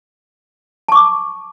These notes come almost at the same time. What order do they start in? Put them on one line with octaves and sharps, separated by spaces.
A5 C#6 D6